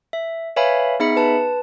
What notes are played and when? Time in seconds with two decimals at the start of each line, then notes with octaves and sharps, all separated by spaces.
0.13 E5
0.56 B4 C#5 E5 F5 G#5 B5
1.00 B3 D#4 G#4 E5 B5 C#7
1.17 B4 A5